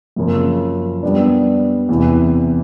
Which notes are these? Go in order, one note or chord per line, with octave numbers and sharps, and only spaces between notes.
F#2 C#3 F3 A#3
G3 B3 D4
E2 C3 E3